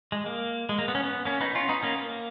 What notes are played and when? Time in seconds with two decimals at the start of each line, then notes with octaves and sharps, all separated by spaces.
0.12 G#3
0.26 A#3
0.69 G#3
0.79 A#3
0.88 B3
0.95 C#4
1.04 B3
1.25 A#3 C#4
1.41 B3 D#4
1.55 C#4 F4
1.69 B3 D#4
1.83 A#3 C#4
1.98 A#3